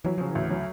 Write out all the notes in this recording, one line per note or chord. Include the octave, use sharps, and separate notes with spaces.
E3 F#3
C#3 F3
E3
D2
F#3